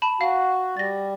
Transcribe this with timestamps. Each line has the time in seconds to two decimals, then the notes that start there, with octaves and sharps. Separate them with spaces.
0.02 A5 B5
0.21 F#4 F5
0.77 G3 A6 A#6